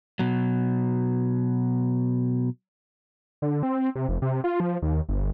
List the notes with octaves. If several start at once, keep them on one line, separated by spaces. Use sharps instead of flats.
B2 F#3
D3
C4
C3
F1
C3
F4
F3
D#2
G1